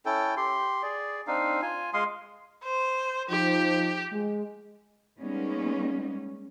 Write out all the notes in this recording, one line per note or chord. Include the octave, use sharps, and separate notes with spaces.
C#4 E4 A4 G5
G4 C6
G#4 D5
C4 D4 D#4 F5
F4 G#5
G#3 F5 C6 D#6
C5
F3 D#4 G4
G#3
G3 G#3 A#3 B3 C#4 D#4